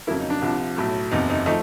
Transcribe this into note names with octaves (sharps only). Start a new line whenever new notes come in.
F2 C#3 F#3 A#3 E4
D#4
D4
C2 C3 F3
B1 A2 F#3 A3
F#1 E2 C3 D#4
D#4
F3 A3 D#4